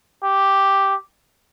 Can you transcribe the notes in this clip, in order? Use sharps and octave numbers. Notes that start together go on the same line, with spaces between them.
G4